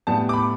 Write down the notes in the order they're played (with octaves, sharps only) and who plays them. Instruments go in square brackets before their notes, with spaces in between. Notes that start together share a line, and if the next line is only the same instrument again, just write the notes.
[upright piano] A2 G3 B3 A5
D6
B5